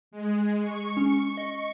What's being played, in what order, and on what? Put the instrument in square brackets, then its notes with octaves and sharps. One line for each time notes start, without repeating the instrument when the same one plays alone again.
[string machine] G#3
C#6
[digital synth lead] C#4
D#5